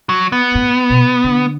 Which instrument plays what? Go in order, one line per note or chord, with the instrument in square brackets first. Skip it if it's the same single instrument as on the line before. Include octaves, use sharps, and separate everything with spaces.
[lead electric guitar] F#3
B3
[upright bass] A2
B2
D3